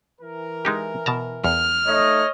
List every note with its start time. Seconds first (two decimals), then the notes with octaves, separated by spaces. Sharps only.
0.21 E3 A#4
0.65 G#3 D#4 G4
1.06 B2 A5 A#5
1.44 E2 F6
1.87 A3 D#4 C#5 D#5